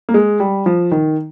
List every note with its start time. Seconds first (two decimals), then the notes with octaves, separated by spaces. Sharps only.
0.09 A#3
0.14 G#3
0.40 G3
0.66 F3
0.92 D#3